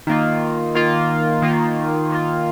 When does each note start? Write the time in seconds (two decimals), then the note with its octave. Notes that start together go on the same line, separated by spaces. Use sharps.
0.07 D#3 A#3 F4
0.75 D#3 A#3 F4
1.42 D#3 A#3 F4
2.10 D#3 A#3 F4